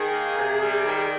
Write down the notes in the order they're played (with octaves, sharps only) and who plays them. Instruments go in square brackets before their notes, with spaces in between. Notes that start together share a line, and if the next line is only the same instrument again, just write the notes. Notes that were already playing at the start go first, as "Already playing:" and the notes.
Already playing: [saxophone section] D#3 [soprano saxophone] G#4
[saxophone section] A#3
C3
G3
D#3